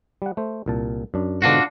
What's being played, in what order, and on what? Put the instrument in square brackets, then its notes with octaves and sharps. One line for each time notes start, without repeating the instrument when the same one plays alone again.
[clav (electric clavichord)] G3 F#5
A3 C5
C2 A#2 A5
F#2 D4
[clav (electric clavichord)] G#2 B2 D3 [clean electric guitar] D4 F4 F#4